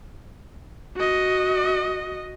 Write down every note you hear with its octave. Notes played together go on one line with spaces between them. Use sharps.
F#4 D#5